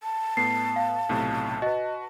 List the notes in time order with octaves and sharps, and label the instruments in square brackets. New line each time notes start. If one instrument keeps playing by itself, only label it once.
[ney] A5
[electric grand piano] A2 B3 [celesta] C7
[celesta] F5
[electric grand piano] B1 A2 C3
[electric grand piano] F#4 B4 [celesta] D#5